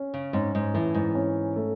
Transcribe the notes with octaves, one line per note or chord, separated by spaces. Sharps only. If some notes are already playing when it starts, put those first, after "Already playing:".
Already playing: C#4
C#3
G#2 C#4
G#2
A2 E3
G#2
C#4
A3